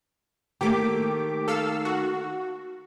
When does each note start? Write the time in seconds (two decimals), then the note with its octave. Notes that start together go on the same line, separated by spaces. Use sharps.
0.61 D#3 A3 A#3 G4 D6
1.48 A4 F5 E6
1.85 F#4